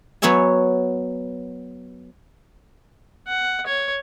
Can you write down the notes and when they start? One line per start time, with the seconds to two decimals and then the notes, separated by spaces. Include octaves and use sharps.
0.22 F#3 B3 C#5 E5 G#5
3.27 F#5
3.66 C#5